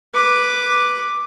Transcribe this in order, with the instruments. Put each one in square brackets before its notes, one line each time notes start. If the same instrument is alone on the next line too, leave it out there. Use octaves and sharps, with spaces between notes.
[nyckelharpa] B4 D6